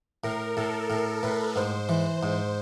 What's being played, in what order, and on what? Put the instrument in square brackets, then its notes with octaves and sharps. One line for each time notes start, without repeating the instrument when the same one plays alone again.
[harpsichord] A2 [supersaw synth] A#4
[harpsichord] A2 [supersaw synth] A4
[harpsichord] A2 [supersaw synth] A#4
[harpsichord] A2 [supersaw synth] B4
[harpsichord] G#2 [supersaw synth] C5
[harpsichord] E3
G#2